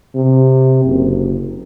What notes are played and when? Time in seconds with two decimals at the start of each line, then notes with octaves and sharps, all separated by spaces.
0.15 C3
0.84 F#1